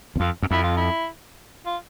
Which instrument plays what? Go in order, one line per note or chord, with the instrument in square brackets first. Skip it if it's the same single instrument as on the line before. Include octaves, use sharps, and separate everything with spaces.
[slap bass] E2
[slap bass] F2 [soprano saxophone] F4
[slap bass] F#2
[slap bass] F2 [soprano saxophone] E4
[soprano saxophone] F4
E4
F4